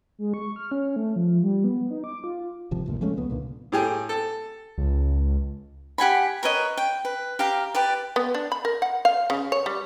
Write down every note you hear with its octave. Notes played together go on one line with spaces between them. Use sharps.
G#3
C#6
F6
C#4
A3
F3
G3
B3
D#4
D6
F4
G#1 C3 F3
G1 D2 A#2
F3 G#3 A3 C#4
C#2 B3
C2 A#2 D3
A2 G4 G#4
A4
C#2
G4 F#5 G#5 B5
A#4 B4 C#5 D#5
G5
B4
G4 F5 A#5
G4 B4 D5
B3
D4
B5
A#4
F#5
F5
C#3
C#5
G3